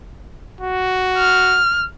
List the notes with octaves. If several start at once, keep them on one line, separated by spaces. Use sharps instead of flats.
F#4
F6